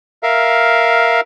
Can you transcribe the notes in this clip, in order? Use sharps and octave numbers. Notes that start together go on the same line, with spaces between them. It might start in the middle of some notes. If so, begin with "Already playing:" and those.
A#4 E5 F5